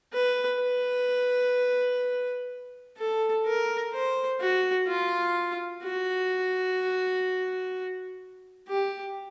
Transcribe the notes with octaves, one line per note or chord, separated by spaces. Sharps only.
B4
B4
A4
A#4
C5
F#4
F4
F#4
G4